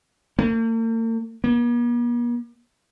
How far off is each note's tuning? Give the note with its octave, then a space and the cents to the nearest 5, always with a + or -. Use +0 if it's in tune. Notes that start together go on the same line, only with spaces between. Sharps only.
A#3 -45
A#3 +45